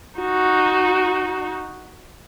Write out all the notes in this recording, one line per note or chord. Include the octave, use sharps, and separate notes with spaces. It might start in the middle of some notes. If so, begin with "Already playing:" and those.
D#4 F#4